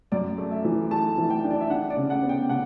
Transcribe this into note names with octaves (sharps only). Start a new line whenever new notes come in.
F#2 D5
A3
E5
E3
A3 A5
E3
G5
D4
D5
E5
D4 F#5
D5
C#3
F#5
B3
G5
C#3 F#5